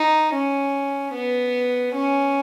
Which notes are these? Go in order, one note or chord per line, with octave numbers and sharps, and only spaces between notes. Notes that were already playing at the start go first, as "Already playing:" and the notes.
Already playing: D#4
C#4
B3
C#4